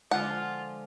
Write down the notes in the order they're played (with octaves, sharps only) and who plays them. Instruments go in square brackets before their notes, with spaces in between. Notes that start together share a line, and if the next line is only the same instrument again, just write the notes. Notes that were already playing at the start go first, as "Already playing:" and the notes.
[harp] D3 F3 G#3 [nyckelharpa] F4 [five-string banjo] F#5